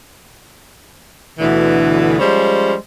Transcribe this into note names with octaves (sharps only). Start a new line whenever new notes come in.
D2 B2 D3 E3
F3 G3 G#3 C#4 C5